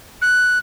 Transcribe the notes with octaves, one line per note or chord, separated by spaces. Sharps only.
F#6